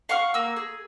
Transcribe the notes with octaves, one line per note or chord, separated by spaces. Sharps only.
F5 F#5 C#6 F6
A#3 E6
G#4